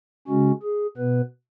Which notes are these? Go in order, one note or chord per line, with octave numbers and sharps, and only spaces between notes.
C#3 G#3 C#4 F#4
G#4
B2 B3 B4